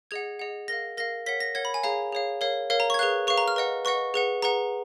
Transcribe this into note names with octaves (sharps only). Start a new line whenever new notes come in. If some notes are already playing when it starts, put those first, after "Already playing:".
G#4 D#5 F#5 G#6
G#4 D#5 F#5
A#4 F5 A#6
A#4 F5 A#6
A#4 C#5 F#5 B6
A#6
A#4 C#5 F#5 G#6
B5
G#5
G#4 C#5 F5 A#5
G#4 C#5 F5
A#4 C#5 F5
A#4 C#5 F5
A#5
C#6 G#6
G#4 B4 F5 F#6
G#4 B4 F5 C#6
A#5
F6
B4 D#5 F#5
B4 D#5 F#5 C#6
G#4 B4 F#5
G#4 B4 F#5 A#5